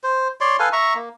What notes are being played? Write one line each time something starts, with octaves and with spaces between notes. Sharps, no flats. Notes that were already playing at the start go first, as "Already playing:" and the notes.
C5
C#5 D5 C6
A4 B4 F5 G#5
E5 A#5 C#6
A#3